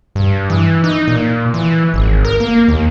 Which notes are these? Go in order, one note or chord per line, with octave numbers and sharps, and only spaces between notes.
G2
E3
D#4
A#2
E3
G#1
A#4
A#3
D#2